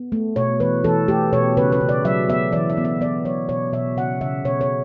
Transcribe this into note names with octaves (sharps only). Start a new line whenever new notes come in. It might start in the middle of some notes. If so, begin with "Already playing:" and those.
Already playing: B3
A3
B2 C#5
E3 B4
E3 A4
A3 G4
B2 C#5
C#3 B4
B4
C#3
D5
F#3 E5
B3 E5
E3 D5
E5
B3
E5
B3 D5
F#3 C#5
B2 C#5
B2 E5
C#3 F#5
C#3 E5
B2 C#5
C#5